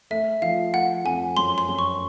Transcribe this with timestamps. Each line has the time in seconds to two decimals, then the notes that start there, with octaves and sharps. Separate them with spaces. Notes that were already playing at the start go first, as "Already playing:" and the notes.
0.11 A3 E5
0.42 F3 F5
0.74 A3 F#5
1.05 F2 G#5
1.37 F#2 C6
1.58 C6
1.69 F#2
1.79 C#6